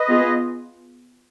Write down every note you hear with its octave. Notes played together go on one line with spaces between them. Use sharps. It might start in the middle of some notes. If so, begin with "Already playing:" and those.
Already playing: B4 D#5
B3 F4 G#4